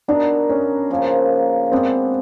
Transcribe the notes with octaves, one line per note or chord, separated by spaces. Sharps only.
B3 D4 D#4 F#4 A#4
C#4
C#3 F3 A#3
G#3 B3 C4 D4